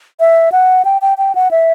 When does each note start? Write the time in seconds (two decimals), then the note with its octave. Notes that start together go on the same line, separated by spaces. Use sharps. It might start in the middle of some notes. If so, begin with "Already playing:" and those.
0.20 E5
0.52 F#5
0.85 G5
1.02 G5
1.18 G5
1.35 F#5
1.51 E5